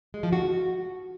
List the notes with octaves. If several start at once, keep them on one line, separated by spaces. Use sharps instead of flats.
G#3
F3
F#4